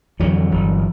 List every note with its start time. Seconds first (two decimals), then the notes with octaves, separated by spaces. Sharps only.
0.20 F2 D3 E3 F#3
0.51 G1